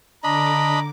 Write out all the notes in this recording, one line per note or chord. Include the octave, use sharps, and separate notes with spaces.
D3 D4 D#5 A#5 B5 D6